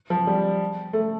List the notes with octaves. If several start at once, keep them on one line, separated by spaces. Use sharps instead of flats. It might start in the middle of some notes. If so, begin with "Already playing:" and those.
F3
G3
A3